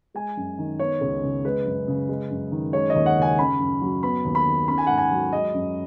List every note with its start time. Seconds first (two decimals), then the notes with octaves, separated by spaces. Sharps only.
0.14 G#3 G#5
0.37 F#2
0.58 D#3
0.79 B3 C#5
1.01 C#2
1.23 C#3
1.45 G#3 B4
1.65 F#2
1.88 C#3
2.09 G#3
2.30 F#2
2.52 D#3
2.73 G#3 C#5
2.90 D#2 D#5
3.06 F#5
3.17 C#3 G#5
3.38 C#4 B5
3.60 F#2
3.82 F#3
4.03 B3 B5
4.25 D#2
4.35 B5
4.47 D#3
4.68 C#4 B5
4.78 G#5
4.87 G#2 F#5
4.98 G#5
5.11 F#3
5.33 G#3 D#5
5.54 F#2